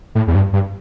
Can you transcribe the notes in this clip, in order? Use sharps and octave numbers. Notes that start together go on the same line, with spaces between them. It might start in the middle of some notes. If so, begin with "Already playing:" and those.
A2
E2
G2
G2